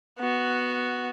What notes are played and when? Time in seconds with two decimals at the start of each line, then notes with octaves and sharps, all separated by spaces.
0.20 B3 F#4